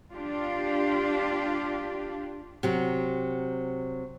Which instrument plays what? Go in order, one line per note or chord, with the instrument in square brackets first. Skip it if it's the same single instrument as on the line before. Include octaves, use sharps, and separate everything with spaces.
[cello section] D4 F4 G4
[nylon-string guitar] C3 F#3